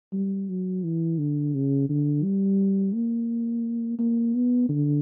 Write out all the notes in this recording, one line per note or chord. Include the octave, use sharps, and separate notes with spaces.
G3
F#3
E3
D3
C#3
D3
G3
A#3
A#3
B3
D3